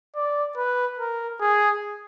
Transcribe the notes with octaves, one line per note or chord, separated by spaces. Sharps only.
D5
B4
A#4
G#4